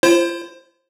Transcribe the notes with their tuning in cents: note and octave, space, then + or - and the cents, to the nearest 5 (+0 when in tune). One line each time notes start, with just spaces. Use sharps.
F4 -40 C5 +20